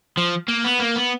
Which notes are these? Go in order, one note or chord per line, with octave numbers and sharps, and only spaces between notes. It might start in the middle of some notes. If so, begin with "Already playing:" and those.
F3
A#3
B3
A#3
B3